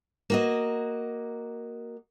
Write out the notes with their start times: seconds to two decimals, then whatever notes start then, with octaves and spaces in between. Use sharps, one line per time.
0.30 A#3 F#4 D#5